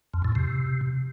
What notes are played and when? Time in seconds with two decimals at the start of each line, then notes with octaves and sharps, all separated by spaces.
0.14 F2
0.24 A2
0.35 C3